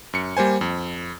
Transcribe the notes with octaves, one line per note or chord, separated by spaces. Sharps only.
F#2 C#7
G3 A#3 C5 G#5
F2